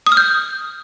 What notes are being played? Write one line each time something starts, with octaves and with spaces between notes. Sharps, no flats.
D#6
F6
G6